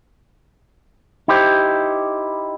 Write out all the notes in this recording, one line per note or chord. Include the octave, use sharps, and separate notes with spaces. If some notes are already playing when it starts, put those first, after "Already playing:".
D#4 E4 G4 C5